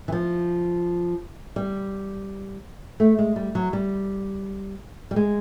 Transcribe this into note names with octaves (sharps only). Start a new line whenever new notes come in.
E3
F3
G3
A3
G#3
G3
F#3
G3
G3
G#3